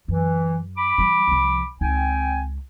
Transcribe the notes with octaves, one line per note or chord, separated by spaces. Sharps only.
F#2 E3
B5 D6
E3 G3
C2 F3
C#2 C4 D#4 G5 G#5